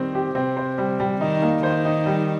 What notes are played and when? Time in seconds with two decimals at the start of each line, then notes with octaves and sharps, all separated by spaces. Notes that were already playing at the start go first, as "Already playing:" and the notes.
Already playing: D#3 G3 C4 C5
0.15 G4
0.35 C3 C4
0.57 C5
0.78 G3
1.00 G3
1.21 D#3 D#4
1.42 A#3
1.63 D#3 C5
1.85 D#4
2.06 G3